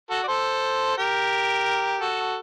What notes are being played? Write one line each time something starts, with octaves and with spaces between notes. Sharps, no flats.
F#4 A4
D5
A4 C5
G4 A#4
F#4 A4